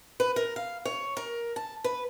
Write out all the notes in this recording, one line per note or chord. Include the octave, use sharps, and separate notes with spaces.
B4
A#4
F5
C#5
A#4
A5
B4